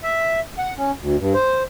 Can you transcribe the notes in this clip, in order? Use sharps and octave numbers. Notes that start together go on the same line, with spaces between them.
E5
F#5
C#4
D2
G2
C5